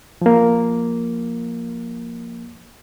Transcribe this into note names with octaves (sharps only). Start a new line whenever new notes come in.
F3 A#3